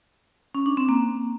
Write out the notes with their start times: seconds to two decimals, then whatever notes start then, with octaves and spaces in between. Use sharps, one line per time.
0.55 C#4
0.66 D4
0.77 C4
0.89 A#3